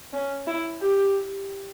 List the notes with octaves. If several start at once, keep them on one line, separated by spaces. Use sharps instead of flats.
C#4
E4
G4